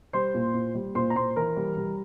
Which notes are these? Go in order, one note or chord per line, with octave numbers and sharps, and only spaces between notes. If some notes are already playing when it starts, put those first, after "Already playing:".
G3 C5 C6
A#2
A#2
G3
A#2 C5 C6
A#5
A#2 C5 C6
E3 A#4 A#5
G3
G3